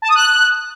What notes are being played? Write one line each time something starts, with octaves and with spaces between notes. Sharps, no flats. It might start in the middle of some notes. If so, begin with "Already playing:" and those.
A5
D#6
F#6